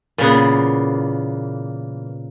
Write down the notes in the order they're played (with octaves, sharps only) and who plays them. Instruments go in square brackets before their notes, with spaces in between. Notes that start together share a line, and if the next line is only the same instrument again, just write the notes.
[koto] A#2 C#3 B3 [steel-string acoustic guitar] E3 A#3